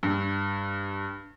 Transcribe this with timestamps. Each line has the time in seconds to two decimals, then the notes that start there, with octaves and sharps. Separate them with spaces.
0.03 G2